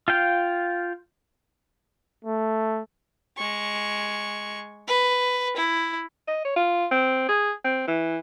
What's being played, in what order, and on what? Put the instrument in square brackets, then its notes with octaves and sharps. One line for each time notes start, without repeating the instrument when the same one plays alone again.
[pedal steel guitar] F4 F5 G5
[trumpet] A3
[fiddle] G#3 C#6
B4
E4
[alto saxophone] D#5
C#5
F4
C4
G#4
C4
E3